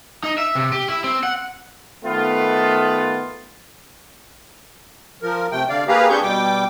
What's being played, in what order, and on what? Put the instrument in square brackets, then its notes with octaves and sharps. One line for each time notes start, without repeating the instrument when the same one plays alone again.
[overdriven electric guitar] D#4
E5
C3
G4
E4
C4
F#5
[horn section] D#3 A3 B3 F4
[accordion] F3 A#4
C3 A3 G5
D3 D5 F5
A#3 G4 G#4 B4 F5 A#5
C4 D4 G4 G#4 C#6 G6
B2 G3 G5 D6